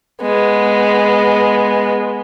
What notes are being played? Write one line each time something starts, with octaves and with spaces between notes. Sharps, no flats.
G#3 B3